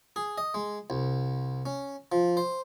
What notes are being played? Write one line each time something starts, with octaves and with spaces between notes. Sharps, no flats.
G#4
D#5
G#3
C2
C#4
F3
C5